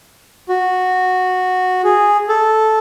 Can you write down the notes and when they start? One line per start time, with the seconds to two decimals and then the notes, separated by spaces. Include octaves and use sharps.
0.49 F#4
1.84 G#4
2.29 A4